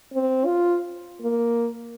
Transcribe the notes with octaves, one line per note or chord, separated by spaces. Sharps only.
C4
F4
A#3